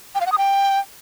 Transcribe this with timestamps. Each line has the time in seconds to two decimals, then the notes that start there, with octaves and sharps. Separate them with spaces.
0.15 G5
0.21 F5
0.26 F#5
0.32 D#6
0.38 G5